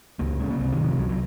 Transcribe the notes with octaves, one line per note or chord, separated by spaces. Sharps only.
C#2 A#3
C#3 G#3
A#3
C2 C4
D#3
C3
F3
C2 F#3
F#3